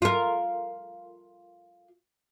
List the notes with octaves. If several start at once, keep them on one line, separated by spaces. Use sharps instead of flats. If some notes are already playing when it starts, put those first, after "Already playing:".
F4 A#4